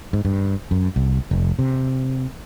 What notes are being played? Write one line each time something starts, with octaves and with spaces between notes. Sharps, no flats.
G#2
G2
F#2
C2
F1
C3